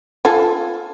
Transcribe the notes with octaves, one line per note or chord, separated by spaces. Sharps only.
F4 A4 G#5